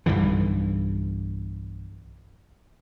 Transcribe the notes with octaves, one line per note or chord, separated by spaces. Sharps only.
B1 G2 D3 E3